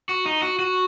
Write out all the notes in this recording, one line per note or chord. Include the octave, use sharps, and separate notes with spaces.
F#4
D#4
F#4
F#4